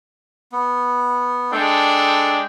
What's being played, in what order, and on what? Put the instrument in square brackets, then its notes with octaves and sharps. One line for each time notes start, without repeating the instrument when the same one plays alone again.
[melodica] B3
[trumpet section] G#3 D4 G5 [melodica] A4